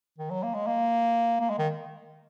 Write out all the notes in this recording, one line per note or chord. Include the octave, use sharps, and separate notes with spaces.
D#3
F#3
A#3
G#3
A#3
A#3
G#3
D#3